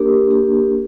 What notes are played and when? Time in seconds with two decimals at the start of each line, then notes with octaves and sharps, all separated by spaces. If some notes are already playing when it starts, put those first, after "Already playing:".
Already playing: A#3 D4 G4 A#4
0.29 A#3 D4 G4 A#4